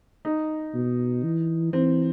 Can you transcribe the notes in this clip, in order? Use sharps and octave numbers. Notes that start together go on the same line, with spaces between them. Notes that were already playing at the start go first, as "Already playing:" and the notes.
D#4
B2
E3
E3 C4